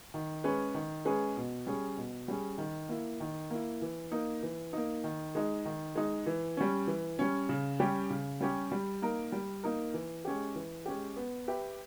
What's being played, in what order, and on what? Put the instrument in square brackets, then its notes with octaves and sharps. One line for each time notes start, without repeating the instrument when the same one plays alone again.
[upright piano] D#3
G#3 C#4 G#4 B4
D#3
G#3 C#4 G#4 B4
B2
G3 C#4 G#4
B2
G3 C#4 G#4
D#3
A#3 E4
D#3
A#3 E4
E3
A#3 D#4
E3
A#3 D#4
D#3
G#3 D#4
D#3
G#3 D#4
E3
G3 C#4
E3
G3 C#4
C#3
G3 C#4 G4
C#3
G3 C#4 G4
G3
A#3 D#4 A#4
G3
A#3 D#4 A#4
E3
G#3 C#4 G4
E3
G#3 C#4 G4
B3
G4 B4 E5